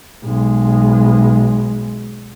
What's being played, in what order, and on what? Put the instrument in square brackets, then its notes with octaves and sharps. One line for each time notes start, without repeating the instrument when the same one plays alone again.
[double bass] B1 G#3